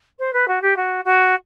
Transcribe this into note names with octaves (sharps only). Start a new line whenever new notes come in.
C5
B4
F#4
G4
F#4
F#4